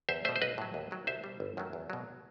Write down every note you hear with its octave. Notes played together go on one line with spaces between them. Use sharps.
E2 C5 E5
B2 A3 C5 E5
C5
B1 B4 D#5
A2 F#3
D#2
D#3 F#3 A3
C2 C5 E5
B2 G3
G1
F#2 D#3 F#3 A3
E2
B2 F#3